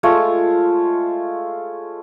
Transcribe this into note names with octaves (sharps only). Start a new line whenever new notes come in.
G#3 A3 F4 C#5